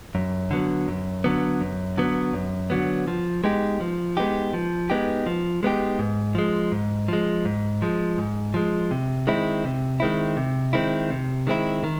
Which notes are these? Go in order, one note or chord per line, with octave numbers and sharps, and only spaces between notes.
F#2
D3 F#3 B3
F#2
D3 F#3 B3
F#2
D3 F#3 B3
F#2
D3 F#3 B3
F3
G#3 B3 D#4 G4
F3
G#3 B3 D#4 G4
F3
G#3 B3 D#4 G4
F3
G#3 B3 D#4 G4
G#2
F3 G#3
G#2
F3 G#3
G#2
F3 G#3
G#2
F3 G#3
C3
D#3 G#3 C4 E4
C3
D#3 G#3 C4 E4
C3
D#3 G#3 C4 E4
C3
D#3 G#3 C4 E4
D#3